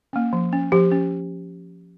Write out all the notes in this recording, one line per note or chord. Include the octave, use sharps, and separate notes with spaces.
A#3 C#4
F3
C#4
F3 G4
C#4